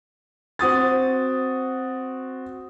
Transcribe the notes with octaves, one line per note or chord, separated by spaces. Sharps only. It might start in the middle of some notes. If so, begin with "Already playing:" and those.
C4 F#4 D#6 A6